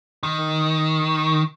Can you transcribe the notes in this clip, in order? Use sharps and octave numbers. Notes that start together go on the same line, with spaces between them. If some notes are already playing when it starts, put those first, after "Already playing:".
D#3